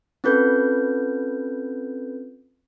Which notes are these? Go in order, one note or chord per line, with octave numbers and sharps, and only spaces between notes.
C4 C#4 F4 A4 B4 G6